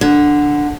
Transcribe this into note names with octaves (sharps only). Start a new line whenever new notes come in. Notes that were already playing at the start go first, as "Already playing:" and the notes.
D3